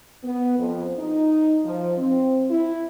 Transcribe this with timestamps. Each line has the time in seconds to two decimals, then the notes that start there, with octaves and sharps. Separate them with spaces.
0.24 B3
0.58 F2
0.99 D#4
1.64 F3
1.97 C4
2.50 E4